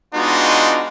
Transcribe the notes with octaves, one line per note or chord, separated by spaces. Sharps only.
G#3 B3 D4 D#4 F4 F#4